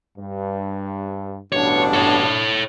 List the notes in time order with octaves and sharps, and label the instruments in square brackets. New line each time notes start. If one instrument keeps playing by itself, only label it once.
[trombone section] G2
[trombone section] A1 G2 B2 [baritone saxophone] D4 [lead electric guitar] C#5
[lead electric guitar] A4 C#5